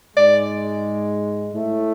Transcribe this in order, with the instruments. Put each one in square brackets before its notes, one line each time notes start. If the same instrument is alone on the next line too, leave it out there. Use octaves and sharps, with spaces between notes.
[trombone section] G#2 G#3 [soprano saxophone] D5
[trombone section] A2 A3